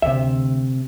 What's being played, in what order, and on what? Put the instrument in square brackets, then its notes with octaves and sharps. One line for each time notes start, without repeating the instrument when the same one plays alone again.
[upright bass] D2 [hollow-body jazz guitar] C3 E5